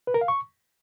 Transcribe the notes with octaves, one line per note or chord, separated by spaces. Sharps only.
B4
A#4
F5
C#6